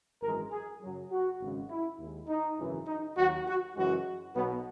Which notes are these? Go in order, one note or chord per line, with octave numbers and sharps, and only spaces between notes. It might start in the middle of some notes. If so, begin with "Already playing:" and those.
G#1 F#2 E3 G#3 A#4
G#4
F#2 C#3 F#3
F#4
G#1 F#2 C#3 G#3
E4
D#2 D#3 G#3
D#4
G#1 F#2 C#3 E3
D#4
D#2 D#3 F#3 F#4
F#4
F#2 C#3 E3 G#3 F#4
B1 B2 F#3 B3